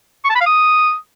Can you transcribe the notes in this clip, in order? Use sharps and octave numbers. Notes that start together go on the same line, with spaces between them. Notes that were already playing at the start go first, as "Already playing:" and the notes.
C#6
A5
B5
F5
D#6